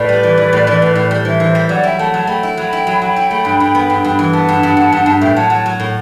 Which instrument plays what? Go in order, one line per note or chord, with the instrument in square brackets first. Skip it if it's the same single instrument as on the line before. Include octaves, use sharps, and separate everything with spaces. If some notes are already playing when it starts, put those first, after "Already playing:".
Already playing: [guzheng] A2 [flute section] B4 D5
[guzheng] G3
E3
E3
A2
E3
A2
A2
G3
[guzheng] E3 [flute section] C5 E5
[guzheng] E3
G3
[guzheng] F#3 [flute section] D5 F#5
[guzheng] E4 [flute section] E5 G5
[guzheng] A3 [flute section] F#5 A5
[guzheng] F#3 [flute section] F#5 A5
[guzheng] A3 [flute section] G5 B5
[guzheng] E4
[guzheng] F#3 [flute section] G5 B5
[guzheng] E4
F#3
[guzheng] F#3 [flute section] G5 B5
[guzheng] E4
A3
G2
G2
B3
G2
G2
E3
[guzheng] B3 [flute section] F#5 A5
[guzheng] G2
G2
G2
G2
G2
[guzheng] A2 [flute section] E5 G5
[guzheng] F#3 [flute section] F#5 A5
[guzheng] F#3 [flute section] F#5 A5
[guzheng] F#3
A2